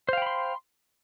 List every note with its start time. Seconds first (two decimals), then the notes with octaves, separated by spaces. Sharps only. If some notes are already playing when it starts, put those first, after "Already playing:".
0.09 C5
0.13 F5
0.18 G5
0.22 B5
0.26 C6